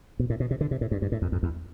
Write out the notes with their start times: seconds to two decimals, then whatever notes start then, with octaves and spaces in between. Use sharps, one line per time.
0.19 B2
0.30 A2
0.40 B2
0.51 C3
0.61 D3
0.71 C3
0.81 A2
0.91 G2
1.02 G2
1.12 A2
1.22 F2
1.32 F2
1.43 E2